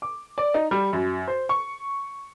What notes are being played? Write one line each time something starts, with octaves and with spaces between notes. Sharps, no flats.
D6
D5
D#4
G3
F#2
C5
C#6